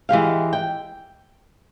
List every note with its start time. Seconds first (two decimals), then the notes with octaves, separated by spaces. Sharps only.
0.09 E3 G#3 G4 F5
0.53 G5